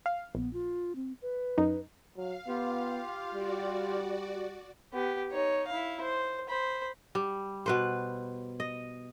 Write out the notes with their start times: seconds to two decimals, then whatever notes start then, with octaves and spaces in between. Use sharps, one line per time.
0.06 F5
0.35 A#1 B3
0.53 F4
0.96 C4
1.22 B4
1.58 F#2 D#4
2.17 F#3 F5
2.48 B3 F4 G4
3.34 G3 F#4 D5
4.93 B3 G4
5.31 D#4 C#5
5.67 E4 F5
6.01 C5
6.48 C5 B5
7.15 G3
7.66 B2 B4 C5
8.60 D#5